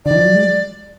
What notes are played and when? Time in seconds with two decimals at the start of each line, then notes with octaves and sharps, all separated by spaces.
0.05 D3 D5
0.11 D#3
0.16 F3
0.25 F#3
0.35 G#3